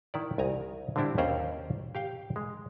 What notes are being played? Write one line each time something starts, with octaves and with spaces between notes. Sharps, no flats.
D#3 E4 D5
C2 G#5 A#5
D3 G3 C4 D4 E4 G4
D#2 C#4 C5 D5 A#5
G4 F5 G5
G#3